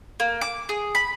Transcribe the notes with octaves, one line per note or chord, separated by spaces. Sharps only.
A#3
D6
G#4
B5